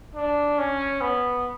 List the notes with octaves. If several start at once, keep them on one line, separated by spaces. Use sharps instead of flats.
D4
C#4
B3